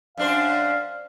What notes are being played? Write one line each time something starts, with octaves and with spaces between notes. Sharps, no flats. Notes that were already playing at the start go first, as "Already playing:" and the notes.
F#2 D4 C5 F5